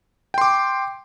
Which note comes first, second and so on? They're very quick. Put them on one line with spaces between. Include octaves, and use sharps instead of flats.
G5 C6 D6